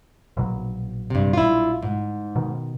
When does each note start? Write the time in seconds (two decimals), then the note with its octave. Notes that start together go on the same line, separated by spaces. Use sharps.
0.37 A#1 B2 F#3
1.10 G2 C3
1.33 E4 F4
1.83 G#2
2.36 B2 D#3